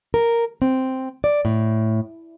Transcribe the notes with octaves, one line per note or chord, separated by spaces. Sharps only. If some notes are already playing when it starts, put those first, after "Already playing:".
A#4
C4
D5
A2